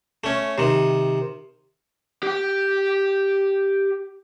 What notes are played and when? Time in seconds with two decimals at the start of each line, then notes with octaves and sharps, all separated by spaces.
0.24 A3 C#4
0.58 C3 D#3
2.23 G4 G5